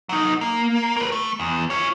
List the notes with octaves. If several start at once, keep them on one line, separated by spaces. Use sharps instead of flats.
F#3 D#4
A#3
A#4 B4
A3
E2
F4 C#5